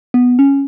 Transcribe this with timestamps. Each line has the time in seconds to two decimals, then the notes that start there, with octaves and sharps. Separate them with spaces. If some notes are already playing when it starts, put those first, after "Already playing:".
0.14 B3
0.39 C#4